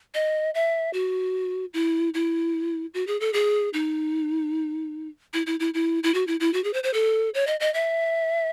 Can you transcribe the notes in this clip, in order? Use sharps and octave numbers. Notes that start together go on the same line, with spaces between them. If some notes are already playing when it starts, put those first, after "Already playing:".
D#5
E5
F#4
E4
E4
F#4
G#4
A4
G#4
D#4
E4
E4
E4
E4
E4
F#4
E4
E4
F#4
G#4
C5
C5
A4
C#5
D#5
D#5
E5